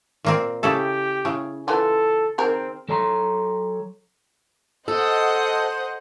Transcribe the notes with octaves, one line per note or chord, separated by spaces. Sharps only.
A#2 A#3 C4
C#3 E4 G4 A4
C#3 E4 G#4
E3 F4 A4 G#5
D#3 C4 G#4 A#4
F#3 A4 C#5 A#5 C6
A4 C5 D#5 F#5 D#6